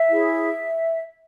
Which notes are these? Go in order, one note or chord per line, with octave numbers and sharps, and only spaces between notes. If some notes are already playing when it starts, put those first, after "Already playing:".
Already playing: E5
E4 G#4 C#5